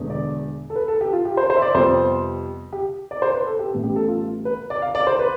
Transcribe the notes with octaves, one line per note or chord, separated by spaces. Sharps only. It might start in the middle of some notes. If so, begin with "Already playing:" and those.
Already playing: E1 E2 D3
D5
A4
B4
A4
G4
F4
G4
C5
C5
E5
D5
F2 C3 G3 B3 C5
G4
D5
C5
B4
A4
G4
A1 A2 G3 B3
G4
A4
F4
B4
D5
F5
D5
C5
B4